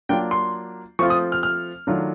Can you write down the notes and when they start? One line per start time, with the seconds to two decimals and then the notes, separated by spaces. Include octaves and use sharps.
0.09 F#3 A#3 D4 F4 G5
0.31 C6
0.99 F3 A3 C4 F4 C#6
1.10 D#6
1.32 F6
1.43 F6
1.87 D#3 F#3 A3 D4 F4